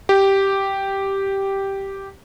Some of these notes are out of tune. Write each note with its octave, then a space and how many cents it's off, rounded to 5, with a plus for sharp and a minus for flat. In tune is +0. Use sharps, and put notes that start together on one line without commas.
G4 -5